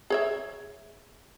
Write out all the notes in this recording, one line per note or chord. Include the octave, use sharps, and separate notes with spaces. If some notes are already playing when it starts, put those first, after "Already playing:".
G#4 C#5 E5